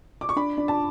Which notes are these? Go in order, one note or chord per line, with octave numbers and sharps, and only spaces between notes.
D6
C#6
D4 B5
D4
A5